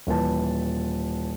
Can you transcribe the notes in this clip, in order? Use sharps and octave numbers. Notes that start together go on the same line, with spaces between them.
D#1 E3 B4 A5